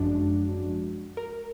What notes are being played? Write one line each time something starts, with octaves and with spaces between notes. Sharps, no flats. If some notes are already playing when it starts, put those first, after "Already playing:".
Already playing: G#1 F#2 F3 G#3 D4 F#4
A#4